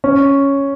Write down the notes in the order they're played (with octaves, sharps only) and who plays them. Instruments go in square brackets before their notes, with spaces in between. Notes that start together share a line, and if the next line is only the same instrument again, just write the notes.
[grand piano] C#4